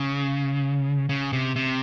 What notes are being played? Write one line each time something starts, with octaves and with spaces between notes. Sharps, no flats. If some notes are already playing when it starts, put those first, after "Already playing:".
Already playing: C#3
C#3
C3
C3